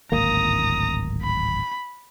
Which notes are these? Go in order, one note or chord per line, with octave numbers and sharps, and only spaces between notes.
D1 G#1 A#3 A#5 D#6
B5